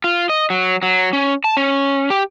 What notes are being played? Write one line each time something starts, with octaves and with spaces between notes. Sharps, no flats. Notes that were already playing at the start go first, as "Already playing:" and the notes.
F4
D#5
F#3
F#3
C#4
A5
C#4
G4